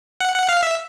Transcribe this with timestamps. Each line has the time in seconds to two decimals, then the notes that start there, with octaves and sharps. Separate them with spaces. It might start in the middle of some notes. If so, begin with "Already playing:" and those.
0.20 F#5
0.35 F#5
0.49 F5
0.63 E5